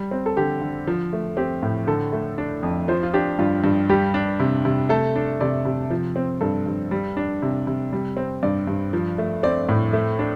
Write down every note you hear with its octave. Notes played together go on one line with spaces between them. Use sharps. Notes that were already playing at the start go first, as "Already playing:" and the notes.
Already playing: G3
C4
A4
D3 G4
D3
F3
A3
C4 G4
A2
D3 A4
A3
D4
F2
F3 C5
F4
D4 G4
G2 F4
G2
G3 G4
D4
C3
C3
A3 A4
D4
C3 D5
C3
F3
C4
G2 A4
G2
G3
D4
C3
C3
G3
C4
G2 D5
G2
F3
A3
C4 D5
A2
A3
D4